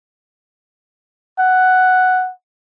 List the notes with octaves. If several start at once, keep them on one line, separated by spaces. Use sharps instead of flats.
F#5